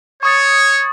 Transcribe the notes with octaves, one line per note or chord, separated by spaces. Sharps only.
C#5 C#6 D#6 A6